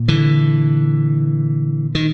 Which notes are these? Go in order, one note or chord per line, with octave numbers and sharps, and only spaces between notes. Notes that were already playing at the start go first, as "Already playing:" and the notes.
Already playing: A#2
D3 E3
D#3